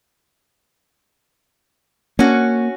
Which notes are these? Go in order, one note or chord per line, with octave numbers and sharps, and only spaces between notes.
A#3 C#4 F#4